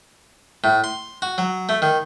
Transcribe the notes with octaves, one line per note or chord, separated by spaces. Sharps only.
A2
C6
F#4
F#3
A3
D#3